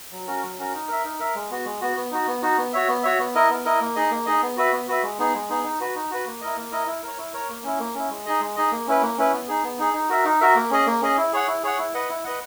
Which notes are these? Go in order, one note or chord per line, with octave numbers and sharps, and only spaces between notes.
F#3
C#4 F#4 A#4
F#3
C#4 F#4 A#4
D#4
A#4 E5
D#4
A#4 E5
G#3
B3 F#4
G#3
B3 F#4
B3
D#4 F#4
B3
D#4 F#4
B3
F#4 C#5 E5
B3
F#4 C#5 E5
B3
E4 A#4 D#5
B3
E4 A#4 D#5
A#3
D#4 G#4 D#5
A#3
D#4 G#4 D#5
B3
F#4 B4 E5
B3
F#4 B4 E5
G#3
B3 D#4 G#4
G#3
B3 D#4 G#4
D#4
F#4 B4
D#4
F#4 B4
A#3
E4 A#4 D#5
A#3
E4 A#4 D#5
E4
A#4 C#5
E4
A#4 C#5
A#3
C#4 E4
A#3
C#4 E4
G#3
D#4 G#4 D#5
G#3
D#4 G#4 D#5
A#3
C#4 E4 B4
A#3
C#4 E4 B4
B3
D#4 G#4
B3
D#4 G#4
D#4
F#4 A#4 E5
D#4
F#4 A#4 E5
A#3
C#4 G#4 D#5
A#3
C#4 G#4 D#5
E4
G#4 C#5 F#5
E4
G#4 C#5 F#5
E4
B4 D#5 F#5
E4
B4 D#5 F#5